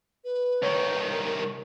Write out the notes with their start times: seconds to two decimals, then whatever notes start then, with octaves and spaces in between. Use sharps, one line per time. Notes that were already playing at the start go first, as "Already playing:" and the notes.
0.24 B4
0.63 C2 D#3 C#5
1.11 A#4